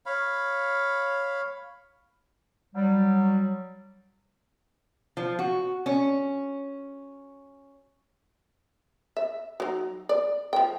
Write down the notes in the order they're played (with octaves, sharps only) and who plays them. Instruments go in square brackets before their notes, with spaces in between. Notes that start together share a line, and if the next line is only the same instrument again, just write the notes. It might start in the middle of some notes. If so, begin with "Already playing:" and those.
[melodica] C#5 F5 B5
[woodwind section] F#3 G3
[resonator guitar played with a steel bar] F3
F#4
C#4
[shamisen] E5
F#3 D#4
D5
F3 G5